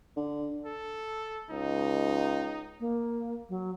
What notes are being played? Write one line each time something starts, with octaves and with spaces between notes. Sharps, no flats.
D3
A4
C#2 D#4
A#3
F#3